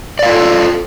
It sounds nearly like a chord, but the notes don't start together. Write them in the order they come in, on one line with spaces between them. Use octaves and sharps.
D5 F5 F4 A4